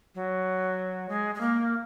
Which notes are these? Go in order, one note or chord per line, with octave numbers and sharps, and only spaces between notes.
F#3
G#3
G#3
A#3